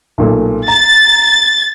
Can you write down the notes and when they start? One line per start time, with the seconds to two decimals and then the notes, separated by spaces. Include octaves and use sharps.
0.18 B1 A#2 A3
0.68 A#5 A6